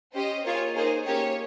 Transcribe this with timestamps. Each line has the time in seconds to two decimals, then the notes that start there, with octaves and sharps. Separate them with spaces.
0.14 C#4 G4 C5 D#5
0.44 A#3 F4 G#4 C#5
0.74 A#3 D#4 G#4 C5
1.05 A#3 C#4 G4 C#5